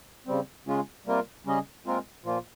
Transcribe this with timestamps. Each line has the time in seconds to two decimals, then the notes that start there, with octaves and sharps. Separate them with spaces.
0.26 C#3 G3 C4
0.66 C#3 G#3 C#4 F4
1.05 C3 G3 A#3 F4 A#4
1.45 C#3 G3 C#4 G#4 D#5
1.84 A#2 G#3 C4 F4 A#4
2.24 A#2 F3 A#3 F4